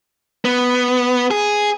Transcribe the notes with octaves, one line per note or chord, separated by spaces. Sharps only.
B3
G#4